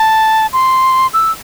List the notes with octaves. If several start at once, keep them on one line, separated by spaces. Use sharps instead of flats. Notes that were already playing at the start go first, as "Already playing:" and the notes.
Already playing: A5
C6
E6